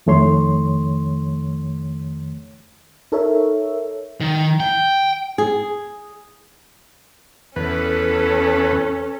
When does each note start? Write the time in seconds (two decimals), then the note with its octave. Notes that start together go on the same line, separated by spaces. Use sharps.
0.06 F2 D#3 A3 C#5 C6
3.12 D#4 A4 A#4 C#5 E5
4.21 D#3
4.60 G5
5.38 G#4
7.56 E2 C#4 A4 B4